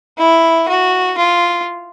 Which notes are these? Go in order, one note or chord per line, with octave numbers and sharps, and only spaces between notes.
E4
F#4
F4